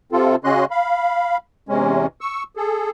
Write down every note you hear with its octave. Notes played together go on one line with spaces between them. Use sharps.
C3 C4 F4 A4
C#3 C#4 F#4 D#5 C6 F#6
F5 B5
E2 C3 G#3 C#4
C#6 E6
G#4 A4